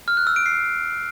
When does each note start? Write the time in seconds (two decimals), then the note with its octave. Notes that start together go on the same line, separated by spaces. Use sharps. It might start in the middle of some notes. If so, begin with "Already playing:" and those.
0.08 F6
0.17 F#6
0.27 E6
0.36 D7
0.46 C7